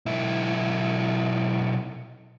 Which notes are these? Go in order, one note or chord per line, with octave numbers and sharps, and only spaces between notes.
B1 E4